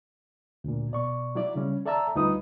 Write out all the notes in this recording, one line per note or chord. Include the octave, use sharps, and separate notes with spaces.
D2 A#2
B2 D5 C#6
F#3 E4 D5
C#3 G3 C#4
A4 D5 E5 A5 A#5 E6
D2 G3 D#4 F4 B4 D#6